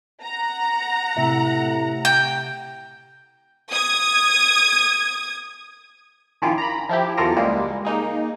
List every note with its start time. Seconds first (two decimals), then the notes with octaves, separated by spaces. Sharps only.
0.23 F#5 A#5
1.17 A2 C3 E5
2.05 G5
3.71 D#6 G#6
6.42 A#1 D#3 C#4 E4 F4 D6
6.58 A#5 B5
6.89 F3 E4 G4
7.17 E2 F#3 F4 A4 A#4 A#6
7.37 C#2 G3 G#3 A#3
7.85 A#3 D#4 G#4